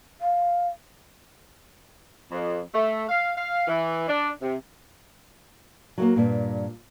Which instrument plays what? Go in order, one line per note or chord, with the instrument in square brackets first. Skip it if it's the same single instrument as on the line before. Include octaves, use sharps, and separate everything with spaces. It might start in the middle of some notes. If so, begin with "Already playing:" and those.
[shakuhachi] F5
[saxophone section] F2
A3
F5
F5
E3
D4
C3
[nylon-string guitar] F#3 A3 A#3
G2 A#2